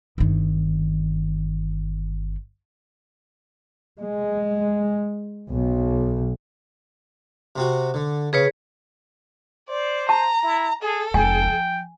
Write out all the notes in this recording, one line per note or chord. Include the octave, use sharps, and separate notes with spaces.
G1 D#3
G#3
B1
C3 C4 F#4
D3
C#3 G#4 B4 C#5
C5 D5
A5 A#5
E4
G#4 A4
F1 G#3 G5 G#5
F3